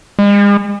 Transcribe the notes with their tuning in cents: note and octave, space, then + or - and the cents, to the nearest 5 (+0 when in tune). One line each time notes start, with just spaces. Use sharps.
G#3 -40